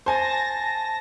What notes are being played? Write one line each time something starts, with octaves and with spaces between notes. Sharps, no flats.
C5 G#5 A5 A#6